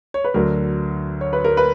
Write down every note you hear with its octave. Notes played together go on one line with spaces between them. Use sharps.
C#5
B4
D2 D3 F#3 A#4
C#5
B4
A#4
B4